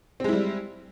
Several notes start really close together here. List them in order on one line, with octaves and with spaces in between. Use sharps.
C4 G#3 E4 G3